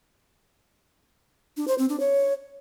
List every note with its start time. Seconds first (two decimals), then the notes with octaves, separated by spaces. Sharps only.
1.57 D4
1.68 C5
1.78 C4
1.89 D4
2.00 C#5